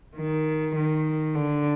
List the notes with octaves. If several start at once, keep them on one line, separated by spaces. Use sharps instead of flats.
D#3
D#3
D3